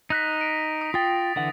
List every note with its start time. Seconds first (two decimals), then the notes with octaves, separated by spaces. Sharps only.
0.10 D#4 F#6 A#6 B6
0.41 D7
0.81 D#6
0.94 F4 G5 D#6 A6
1.36 D3 E3 F#5